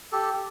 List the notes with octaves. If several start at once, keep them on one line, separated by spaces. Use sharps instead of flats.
G4 A4